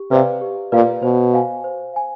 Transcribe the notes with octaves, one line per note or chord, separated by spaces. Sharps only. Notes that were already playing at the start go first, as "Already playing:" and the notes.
Already playing: G4
C3 B4 D5 F5
G4
A#2 B4 D5 F5
B2 C5
F5 G#5
C5
F5 G#5